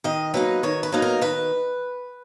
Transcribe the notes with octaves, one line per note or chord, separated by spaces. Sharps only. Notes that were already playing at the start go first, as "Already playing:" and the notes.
D#3 D#5
F#3 A#3 D#4 B4
D#3 C#5
B4
F#3 A#3 D#4
A#4
D#3 B4